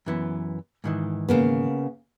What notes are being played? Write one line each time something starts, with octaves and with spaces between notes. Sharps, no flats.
F#2 E3 B3
G#2 D#3 E3
C#3 A#3 B3